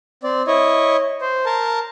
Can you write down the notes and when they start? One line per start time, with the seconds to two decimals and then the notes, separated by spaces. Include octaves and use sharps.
0.23 C4 D5
0.47 E4 C#5 D#5
1.21 C5
1.46 A#4 A5